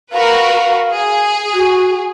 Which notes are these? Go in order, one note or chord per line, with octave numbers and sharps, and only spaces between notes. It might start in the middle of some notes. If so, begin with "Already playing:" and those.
F#4 A#4 B4 F5
G#4
F#4